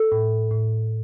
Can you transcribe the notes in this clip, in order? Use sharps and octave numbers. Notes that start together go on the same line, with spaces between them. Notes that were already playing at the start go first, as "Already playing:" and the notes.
Already playing: A4
A2
A2